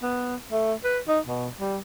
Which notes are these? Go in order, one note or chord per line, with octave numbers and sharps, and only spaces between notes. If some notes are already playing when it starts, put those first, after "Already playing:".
B3
A3
B4
D#4
B2
G3